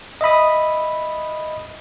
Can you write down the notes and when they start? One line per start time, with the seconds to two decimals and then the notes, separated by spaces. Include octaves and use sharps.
0.21 D#5 E5 B5 D#6